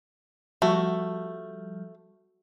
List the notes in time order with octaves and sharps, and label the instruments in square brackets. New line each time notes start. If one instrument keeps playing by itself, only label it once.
[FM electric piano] F3 G3 [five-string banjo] A3 [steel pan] F#4